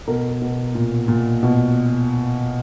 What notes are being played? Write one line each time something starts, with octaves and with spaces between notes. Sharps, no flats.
B2 A#4
B2
A#2
A#2
B2